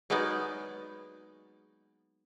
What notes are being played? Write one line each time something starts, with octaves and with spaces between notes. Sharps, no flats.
F#3 G#3 A#3 B3 D#4 D5